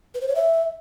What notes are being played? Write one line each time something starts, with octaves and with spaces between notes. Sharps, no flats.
B4
C5
C#5
E5